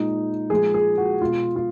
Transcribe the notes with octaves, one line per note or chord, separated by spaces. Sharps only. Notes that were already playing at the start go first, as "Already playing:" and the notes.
Already playing: A#2 G#3 D#4
A#2 F3 G#3 G#4
G#4
F#4
B2 G#3 F4
F4